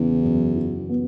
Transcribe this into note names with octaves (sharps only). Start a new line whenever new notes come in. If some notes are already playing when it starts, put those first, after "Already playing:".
Already playing: E2 C#3 B3
F#2
E3
B3